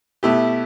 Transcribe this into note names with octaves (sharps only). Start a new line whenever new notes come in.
B2 A3 E4 G4